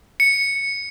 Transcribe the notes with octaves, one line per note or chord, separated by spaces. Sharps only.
C#7